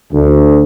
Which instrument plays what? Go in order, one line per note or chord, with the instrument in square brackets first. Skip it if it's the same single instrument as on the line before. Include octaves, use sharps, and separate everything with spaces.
[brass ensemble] D2